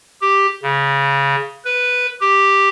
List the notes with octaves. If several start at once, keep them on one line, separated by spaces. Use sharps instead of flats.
G4
C#3
B4
G4